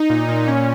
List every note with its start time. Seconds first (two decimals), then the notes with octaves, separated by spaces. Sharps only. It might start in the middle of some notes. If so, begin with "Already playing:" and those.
Already playing: D#4
0.10 A#2
0.28 A#2
0.48 C#4